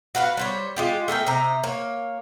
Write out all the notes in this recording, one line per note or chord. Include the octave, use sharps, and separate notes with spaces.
F#4 B4 F5 F#5
G3 C5 C#5
G#3 F4 G4
A3 G#4 A#4 G5
C3 D#4 A#5
A#3 C#5